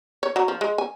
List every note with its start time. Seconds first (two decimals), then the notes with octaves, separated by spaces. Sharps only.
0.23 C#5
0.36 F#3
0.48 F3
0.61 G#3
0.78 G#5